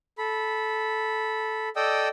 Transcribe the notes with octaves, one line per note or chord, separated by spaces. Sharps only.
A4 B5
A4 D5 D#5 G5 D#6 E6